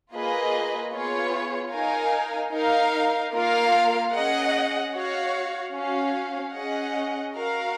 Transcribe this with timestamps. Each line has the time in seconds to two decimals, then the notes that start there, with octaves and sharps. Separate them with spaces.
0.12 A#3 F4 G#4 B4 D#5
0.93 B3 F4 G#4 C#5
1.73 D#4 A#4 F5 G#5
2.52 D#4 A#4 F5
3.33 A#3 F4 A#4 F5
4.13 C#4 G#4 D#5 F#5
4.93 F#4 C#5 F5
5.73 C#4 F#4 C#5 F5
6.54 C#4 G#4 D#5 F#5
7.34 F#4 A#4 F5